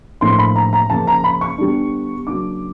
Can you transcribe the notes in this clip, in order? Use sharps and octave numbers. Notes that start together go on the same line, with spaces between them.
A2 F3 A#3 D4 C6
B5
A#5
A#5
C#3 F3 A#3 A5
A#5
B5
C#6
D3 G3 B3 D4
C#3 F#3 A#3 D4 D6